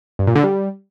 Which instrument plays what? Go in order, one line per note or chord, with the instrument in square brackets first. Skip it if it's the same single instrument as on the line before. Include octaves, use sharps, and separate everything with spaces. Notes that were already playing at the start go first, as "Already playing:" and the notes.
[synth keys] G2
A#2
D3
G3